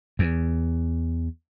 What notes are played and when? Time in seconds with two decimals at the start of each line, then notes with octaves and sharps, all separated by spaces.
0.19 E2